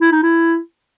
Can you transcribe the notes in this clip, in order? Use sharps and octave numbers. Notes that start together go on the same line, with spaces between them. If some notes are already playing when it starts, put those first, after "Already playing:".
E4
D#4
E4